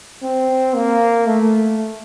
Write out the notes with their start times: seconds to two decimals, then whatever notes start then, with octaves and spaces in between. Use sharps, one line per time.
0.23 C4
0.75 A#3
1.27 A3